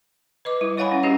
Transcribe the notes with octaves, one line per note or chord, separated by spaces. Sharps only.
B4 D#5 D6
G3 E4
E4 C#5 F5 F#5 G#5 B5
C#4 E4
C#4 D4 F#4 G4 D#5